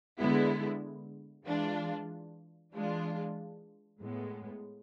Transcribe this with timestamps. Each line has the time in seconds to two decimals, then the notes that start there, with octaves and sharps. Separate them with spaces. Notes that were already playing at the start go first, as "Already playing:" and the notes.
0.18 D3 G#3 B3 E4
1.45 E3 G#3 D4 F4
2.73 E3 G#3 D4 F4
4.01 A2 G#3 B3